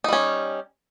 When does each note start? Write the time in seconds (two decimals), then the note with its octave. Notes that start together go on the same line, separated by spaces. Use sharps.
0.04 D#4
0.09 G3
0.13 C#4